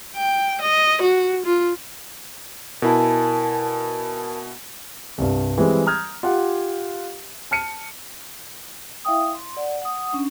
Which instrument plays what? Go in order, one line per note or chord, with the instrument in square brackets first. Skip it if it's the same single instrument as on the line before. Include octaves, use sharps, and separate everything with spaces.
[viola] G5
D#5
F#4
F4
[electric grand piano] B2 E4 [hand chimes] A#4 G#5 A5
[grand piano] C2 G2
E3 G3 G#3 C4
A#5 D#6 F6 G6 G#6
F4 G4 F5 F#5
A5 F6 C#7 D#7
[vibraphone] E4 E5 F5 G5 D#6
C6
D5 F#5
F#5 D#6
C#4 D4